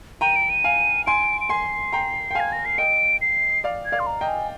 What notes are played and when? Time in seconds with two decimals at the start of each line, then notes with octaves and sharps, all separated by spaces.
0.21 G5 A#5 D#7
0.36 D7
0.50 D#7
0.64 F5 G#5
1.07 G#5 C6 D7
1.41 D7
1.49 G#5 C6 C7
1.93 G5 A#5
2.31 G5
2.35 F5 G#5 G#6
2.52 A#6
2.65 C7
2.78 D#5 G5 D7
3.21 C7
3.64 D5 F5
3.85 G#6
3.92 D5 F5
4.00 C6
4.07 A#5
4.21 D#5 G5
4.28 G#5